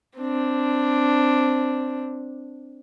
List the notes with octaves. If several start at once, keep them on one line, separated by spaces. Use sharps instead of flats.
C4 D4